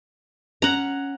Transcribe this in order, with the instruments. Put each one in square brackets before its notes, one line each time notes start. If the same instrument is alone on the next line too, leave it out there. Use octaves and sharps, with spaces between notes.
[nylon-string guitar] C#4 [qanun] F#5 A#5